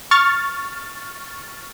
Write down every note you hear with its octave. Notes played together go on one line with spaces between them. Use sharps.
C#6 F6 A6